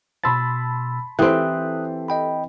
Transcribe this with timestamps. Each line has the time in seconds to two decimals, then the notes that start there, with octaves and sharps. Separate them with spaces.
0.24 B2 A5 B5 C6 E6 A6
1.19 E3 C4 G4 A4 C5 D#6 F#6
2.08 D#5 G5 B5